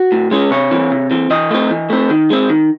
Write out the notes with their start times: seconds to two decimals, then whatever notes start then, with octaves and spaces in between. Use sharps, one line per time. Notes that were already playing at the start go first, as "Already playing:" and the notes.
Already playing: F#4
0.12 A2
0.31 G#3 C#4
0.51 C3 C#5
0.71 E3 C4
0.91 C3
1.11 E3 C4
1.30 E3 D#5
1.51 A3 C4
1.71 E3
1.90 A3 C4
2.10 D#3
2.30 G#3 C4
2.50 D#3